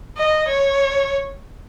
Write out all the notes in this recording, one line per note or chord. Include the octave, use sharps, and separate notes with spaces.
D#5
C#5